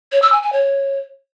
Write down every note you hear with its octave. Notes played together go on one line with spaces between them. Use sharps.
C#5
E6
G#5
G#5
C#5